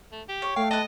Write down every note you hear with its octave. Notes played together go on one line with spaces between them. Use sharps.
A3
G4
C#5
A3 F5 G5
B4 D#5 A5